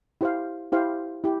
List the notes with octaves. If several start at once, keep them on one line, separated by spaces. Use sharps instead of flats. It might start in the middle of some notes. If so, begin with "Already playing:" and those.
E4 G4 C5 F5
E4 G4 C5 F5
E4 G4